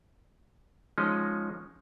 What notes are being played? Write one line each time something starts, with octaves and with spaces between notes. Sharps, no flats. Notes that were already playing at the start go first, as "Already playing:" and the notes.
F3 G#3 C#4 D#4 D#5